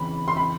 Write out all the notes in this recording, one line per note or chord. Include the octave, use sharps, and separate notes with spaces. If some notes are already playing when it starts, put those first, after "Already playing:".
Already playing: E2 C#3 E3 B5
C6
B5